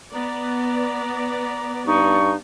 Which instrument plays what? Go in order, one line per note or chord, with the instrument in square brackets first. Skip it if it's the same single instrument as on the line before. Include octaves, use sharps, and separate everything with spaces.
[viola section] B3 D5 [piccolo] A#5
[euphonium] G2 [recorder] D#4 [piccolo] C#6